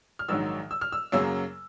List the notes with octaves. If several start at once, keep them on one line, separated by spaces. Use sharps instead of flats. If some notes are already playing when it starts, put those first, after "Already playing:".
F6
A#1 G#2 D#3 F#3 E6
E6
F6
E6
F#2 C#3 F#3 A#3 E6